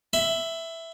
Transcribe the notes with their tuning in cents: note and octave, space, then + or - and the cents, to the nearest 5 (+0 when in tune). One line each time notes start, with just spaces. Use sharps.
E5 +0 B5 +30